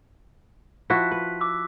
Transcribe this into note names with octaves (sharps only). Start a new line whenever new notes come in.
F3 E4 F#4 C#6 F#6 B6
B4
D6 E6